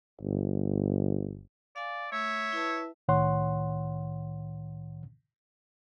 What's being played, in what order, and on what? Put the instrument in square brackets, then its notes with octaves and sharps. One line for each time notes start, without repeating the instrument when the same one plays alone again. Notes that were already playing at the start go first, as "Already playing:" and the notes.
[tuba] G1
[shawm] D5 [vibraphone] F5 G#5
[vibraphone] A3 [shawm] C#5 [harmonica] E5
[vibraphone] E4 B4 A5
[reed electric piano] C2 A2 D#3 C#5 F#5 C6